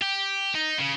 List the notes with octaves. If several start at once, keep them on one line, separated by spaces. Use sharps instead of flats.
G4
D#4
C#3